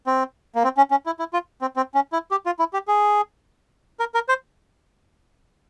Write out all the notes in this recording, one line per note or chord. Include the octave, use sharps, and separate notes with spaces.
C4
A#3
C4
C#4
C#4
E4
E4
F4
C4
C4
C#4
E4
G4
F4
E4
G4
G#4
A#4
A#4
C5